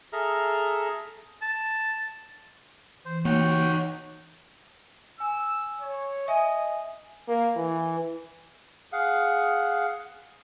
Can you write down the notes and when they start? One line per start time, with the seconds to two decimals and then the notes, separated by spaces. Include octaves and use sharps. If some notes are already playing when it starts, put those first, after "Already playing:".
0.13 G#4 A4 E5 A#5 F6
1.42 A5
3.05 E3 C5
3.25 A#3 D#4 F#4 C#5 G5 C#6
5.20 G#5 E6
5.81 C#5
6.28 D#5 E5 G#5
7.28 A#3
7.56 E3
8.93 G#4 F5 F#5